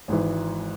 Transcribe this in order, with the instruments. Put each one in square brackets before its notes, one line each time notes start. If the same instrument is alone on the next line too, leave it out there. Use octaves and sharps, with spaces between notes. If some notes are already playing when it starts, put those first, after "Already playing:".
[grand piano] G#1 G#2 E3